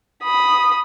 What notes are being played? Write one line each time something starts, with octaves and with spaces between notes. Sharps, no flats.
B5 D#6